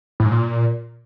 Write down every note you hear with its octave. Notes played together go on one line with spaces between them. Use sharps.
A2
G#2
A#2